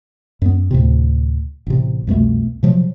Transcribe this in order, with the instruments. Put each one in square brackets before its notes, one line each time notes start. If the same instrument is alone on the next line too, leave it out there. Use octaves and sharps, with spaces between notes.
[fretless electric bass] F#2 B3
D2 A2 C3
A1 C3
C2 F2 B2 A3
C3 F3 F#3